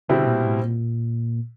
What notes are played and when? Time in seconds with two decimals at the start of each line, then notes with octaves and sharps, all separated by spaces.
0.08 B2 D3 G3 C4 E4
0.26 A#2
0.44 A2
0.62 A#2